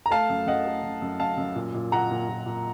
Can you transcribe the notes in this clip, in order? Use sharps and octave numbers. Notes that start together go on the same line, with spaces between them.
A#5
A3 F5 A5
F#2
F#2 D#5 F#5
A3
F#2
F#2
F#2 F5 A5
F#2
A#2
A#2
A#2 F#5 A#5
A#2
A#2
A#2